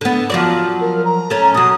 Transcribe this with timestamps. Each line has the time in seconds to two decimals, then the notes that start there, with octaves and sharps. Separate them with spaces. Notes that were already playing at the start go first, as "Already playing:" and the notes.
0.01 D3 B3
0.30 F3 F#3 D5
0.81 A#4
1.05 A#5
1.30 A3 C#4
1.54 B2 F#3 D#6